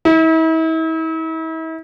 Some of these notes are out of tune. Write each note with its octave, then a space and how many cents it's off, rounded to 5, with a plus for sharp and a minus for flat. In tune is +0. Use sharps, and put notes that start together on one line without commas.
E4 -40